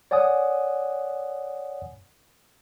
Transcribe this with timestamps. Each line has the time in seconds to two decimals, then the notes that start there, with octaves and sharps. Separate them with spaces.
0.11 C#5 D5 F#5 G#5 D#6